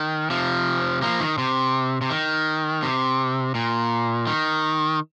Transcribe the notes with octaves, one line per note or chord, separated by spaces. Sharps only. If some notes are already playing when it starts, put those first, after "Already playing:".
Already playing: D#3
C3 F3
F3 A#3
D#3
C3
C3
D#3
C3
A#2
D#3